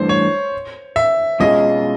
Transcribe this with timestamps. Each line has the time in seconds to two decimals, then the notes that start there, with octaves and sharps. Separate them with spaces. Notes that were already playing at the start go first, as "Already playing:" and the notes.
Already playing: G2 E3 A3 D4 C5
0.09 C#5
0.96 E5
1.40 B2 G#3 C#4 F4 G#4 D#5